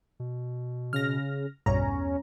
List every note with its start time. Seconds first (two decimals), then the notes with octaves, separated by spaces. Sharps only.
0.20 B2
0.93 C#3 F6 A#6
1.66 B1 E2 G2 C#4 A#5